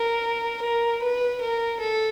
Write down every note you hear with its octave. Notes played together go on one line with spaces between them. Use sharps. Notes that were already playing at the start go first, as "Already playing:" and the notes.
Already playing: A#4
A#4
B4
A#4
A4